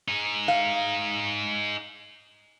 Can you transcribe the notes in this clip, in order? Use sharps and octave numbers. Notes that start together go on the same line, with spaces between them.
D#4 G#4
F5